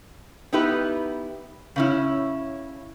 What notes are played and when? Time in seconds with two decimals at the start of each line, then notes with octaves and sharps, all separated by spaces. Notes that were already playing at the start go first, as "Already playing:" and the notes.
0.53 B3 D#4 E4 G4 B4
1.76 C#3 C#4 E4